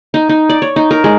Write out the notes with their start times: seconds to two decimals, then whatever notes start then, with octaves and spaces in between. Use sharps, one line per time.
0.14 D#4
0.29 D#4
0.49 D5
0.62 C#5
0.76 D#4
0.91 A#4
1.04 G#3